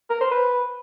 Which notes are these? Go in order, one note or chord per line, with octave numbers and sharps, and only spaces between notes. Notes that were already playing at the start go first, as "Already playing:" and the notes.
A#4
C5
B4